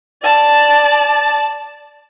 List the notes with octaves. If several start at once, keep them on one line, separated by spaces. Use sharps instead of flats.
D5 A5